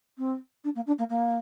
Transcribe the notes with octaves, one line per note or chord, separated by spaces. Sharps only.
C4
D4
A#3
D4
A#3
A#3